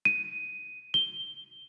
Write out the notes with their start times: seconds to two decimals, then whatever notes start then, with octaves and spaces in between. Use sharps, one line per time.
0.05 D#7
0.94 G7